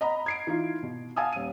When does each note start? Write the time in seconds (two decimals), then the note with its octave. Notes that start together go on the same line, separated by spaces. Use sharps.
0.01 D#5 F#5 A#5 B5
0.26 G#6 C7 D7
0.47 E3 D#4 F4
0.83 B2
1.16 F5 F#5 G#5 A5 D#6 E6
1.32 D#1 D#7